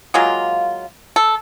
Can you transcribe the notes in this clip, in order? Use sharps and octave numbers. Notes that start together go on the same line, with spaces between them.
F#3 G#3 A#3 F4
A4